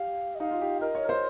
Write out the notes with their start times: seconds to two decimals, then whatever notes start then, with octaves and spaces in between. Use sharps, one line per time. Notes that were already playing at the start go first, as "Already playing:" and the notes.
Already playing: G4 F5
0.35 D#5
0.40 D#4 F5
0.51 F4
0.61 G4
0.81 A#4 D#5
0.95 C#5
1.04 A#4
1.09 C5